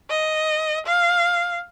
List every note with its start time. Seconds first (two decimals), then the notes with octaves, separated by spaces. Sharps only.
0.10 D#5
0.86 F5